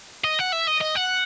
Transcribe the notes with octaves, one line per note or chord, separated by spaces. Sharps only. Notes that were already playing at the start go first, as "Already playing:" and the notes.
D#5
F#5
E5
D#5
D#5
F#5